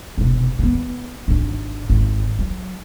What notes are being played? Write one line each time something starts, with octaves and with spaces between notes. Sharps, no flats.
F1 B2
A#3 B3
G#1 D4
G#1
F#3